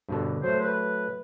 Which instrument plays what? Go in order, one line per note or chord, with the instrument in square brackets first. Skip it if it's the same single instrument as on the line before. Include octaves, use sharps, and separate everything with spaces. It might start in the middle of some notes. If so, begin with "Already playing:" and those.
[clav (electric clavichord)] G2 B2 D3
[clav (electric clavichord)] F#3 A3 [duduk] C5
[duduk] B4